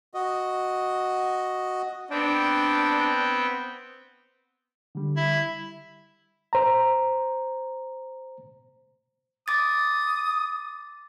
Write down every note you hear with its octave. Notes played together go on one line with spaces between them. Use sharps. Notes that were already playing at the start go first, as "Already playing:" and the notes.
F#4 D#5
B3 C4 D4 G5
D3 G3
E4
C5 A#5
D6 D#6 A6